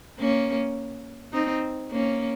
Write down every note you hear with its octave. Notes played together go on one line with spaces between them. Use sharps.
A#3 C#4
C4 D#4
A#3 C#4